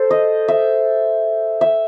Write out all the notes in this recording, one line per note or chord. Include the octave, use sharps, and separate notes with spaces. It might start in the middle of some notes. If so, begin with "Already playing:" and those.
Already playing: A4 C5
D#5
E5
E5